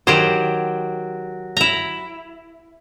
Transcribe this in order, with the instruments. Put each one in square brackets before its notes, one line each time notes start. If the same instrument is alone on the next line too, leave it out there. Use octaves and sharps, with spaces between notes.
[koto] D#3 G4 C5 [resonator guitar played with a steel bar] F#3
[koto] E4 A#5